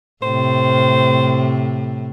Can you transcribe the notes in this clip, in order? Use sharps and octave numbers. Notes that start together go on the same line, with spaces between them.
A2 C3 C5